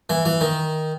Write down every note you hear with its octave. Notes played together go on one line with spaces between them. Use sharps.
E3
E3
D#3